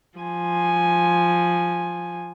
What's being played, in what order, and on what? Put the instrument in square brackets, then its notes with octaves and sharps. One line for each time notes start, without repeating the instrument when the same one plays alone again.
[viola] F3 G#5